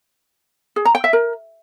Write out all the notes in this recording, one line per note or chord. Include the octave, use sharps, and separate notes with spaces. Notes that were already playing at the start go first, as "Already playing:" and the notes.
G#4
A#5
G5
E5
A#4